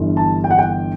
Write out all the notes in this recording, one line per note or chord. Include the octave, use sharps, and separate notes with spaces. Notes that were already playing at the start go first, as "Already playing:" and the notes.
Already playing: G1 G2 E3
A5
G5
F#5
G5